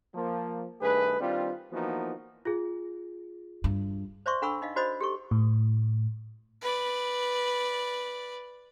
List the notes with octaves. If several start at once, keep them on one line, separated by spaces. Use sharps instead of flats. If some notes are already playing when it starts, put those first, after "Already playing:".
F3 A#3
G2 D#3 A3 G#4 B4
D#3 G3 C4 D4 F4
E3 F3 A#3 B3 D#4 F#4
F4 G#4
G2
C5 D5 E5 C6 C#6
D4 A4 F#5 B5 C#6 E6
D#4 D#5 F5
F#4 C5 D5 D#5 B5 D#6
G4 A4 C#6
A2
B4 D5